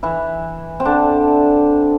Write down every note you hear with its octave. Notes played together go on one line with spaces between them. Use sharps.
E3 E4
C4
D3 D4